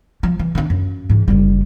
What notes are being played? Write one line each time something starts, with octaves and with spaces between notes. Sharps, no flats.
F3
E3
D#3 D4
F#2
G#2 E3
F#1 G3